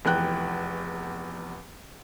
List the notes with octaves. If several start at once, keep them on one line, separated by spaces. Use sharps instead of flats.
F1 E2 G5 F#6